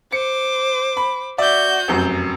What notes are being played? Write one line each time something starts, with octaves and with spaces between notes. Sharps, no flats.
C5 D6 C#7
B5
F#4 D5 E5 G6
F1 F#2